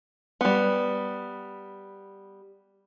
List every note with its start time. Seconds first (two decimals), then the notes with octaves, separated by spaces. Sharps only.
0.41 G3 B3